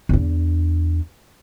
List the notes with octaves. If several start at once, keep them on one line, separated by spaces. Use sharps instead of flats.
E2 D4